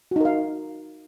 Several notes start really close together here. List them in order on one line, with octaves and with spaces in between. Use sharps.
F#4 D#4 A#4 F5